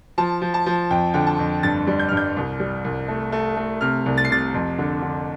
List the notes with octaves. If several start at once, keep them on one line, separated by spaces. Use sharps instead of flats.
F3 A5
F3
A5
F3
F2 G5
D3 G5
A5
F2
G2 A6
G3
G6
G2 F6
G6
C2
G3
C2
A3
A3
A3
C3 F6
C2
A6
C7
C3 A6
F2
D3
D3